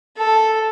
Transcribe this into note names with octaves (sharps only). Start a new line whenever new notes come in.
A4